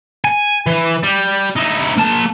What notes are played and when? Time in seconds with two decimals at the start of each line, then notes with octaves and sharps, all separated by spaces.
0.25 G#5
0.66 E3
1.04 G3
1.56 D#4 E4
1.98 A#3 A5